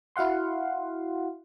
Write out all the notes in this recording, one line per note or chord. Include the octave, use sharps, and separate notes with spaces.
E4 F#4 F5 F#5 C6